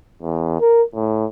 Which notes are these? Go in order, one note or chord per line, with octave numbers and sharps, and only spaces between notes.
E2
A#4
A2